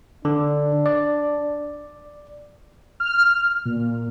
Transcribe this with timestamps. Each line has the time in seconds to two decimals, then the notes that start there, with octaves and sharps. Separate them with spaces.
0.25 D3 D4
0.86 D5
3.00 F6
3.65 A#2